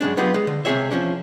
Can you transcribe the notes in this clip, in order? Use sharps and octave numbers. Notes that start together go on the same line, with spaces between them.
F#2 C#3 G#3 D4
F#3 B3 D#4 F4 G4 G#4
G#3
D3
C#2 C3 A3 G#4 C#5 E5
E2 F3 A3 C#4 D4